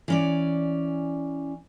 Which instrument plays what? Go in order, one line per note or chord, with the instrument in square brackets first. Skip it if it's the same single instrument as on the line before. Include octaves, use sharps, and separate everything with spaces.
[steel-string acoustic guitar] E3 C#4 D5